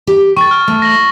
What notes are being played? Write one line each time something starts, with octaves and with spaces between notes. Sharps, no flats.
G4
G5 C#6 A6
F6
A3
A#6 F#7